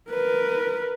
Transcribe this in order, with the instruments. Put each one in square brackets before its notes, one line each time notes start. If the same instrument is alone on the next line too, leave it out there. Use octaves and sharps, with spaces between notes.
[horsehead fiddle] A#4 B4